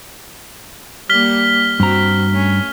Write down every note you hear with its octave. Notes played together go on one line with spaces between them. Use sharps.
G3 A#3 F6 B6 G7
G2 C4 F#4 A#5
A3 C#4